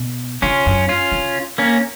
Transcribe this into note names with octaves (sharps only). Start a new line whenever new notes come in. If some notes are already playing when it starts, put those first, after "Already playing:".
Already playing: B2
C#3 C#4 F4
F#2
C#4 F4
C#3
A#3 C#4